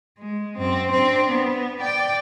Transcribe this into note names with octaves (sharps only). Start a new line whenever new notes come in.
G#3
F#2 C4
C4 D4
B3
D5 G5